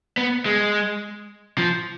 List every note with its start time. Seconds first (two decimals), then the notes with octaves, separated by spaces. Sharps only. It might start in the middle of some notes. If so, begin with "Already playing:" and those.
0.17 B3
0.46 G#3
1.58 F3